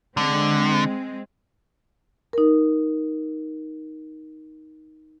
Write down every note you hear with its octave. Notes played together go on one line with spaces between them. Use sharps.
D3 G#3 C4
D#4 A#4